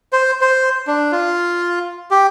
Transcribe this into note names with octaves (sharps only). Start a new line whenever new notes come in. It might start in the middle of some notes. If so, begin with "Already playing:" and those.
C5
C5
D4
F4
G4